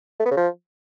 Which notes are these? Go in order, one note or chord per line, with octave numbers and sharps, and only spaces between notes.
A3
B3
C#3
F3